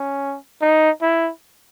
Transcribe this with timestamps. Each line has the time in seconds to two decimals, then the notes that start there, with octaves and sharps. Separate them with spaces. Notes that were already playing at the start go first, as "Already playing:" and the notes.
Already playing: C#4
0.62 D#4
1.02 E4